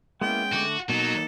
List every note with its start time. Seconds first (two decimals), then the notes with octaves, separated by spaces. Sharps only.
0.21 G#3 A#3 B3 C#4 E4 G5
0.53 D3 A3 F#4 D6
0.89 B2 F#3 A#3 D#4 A4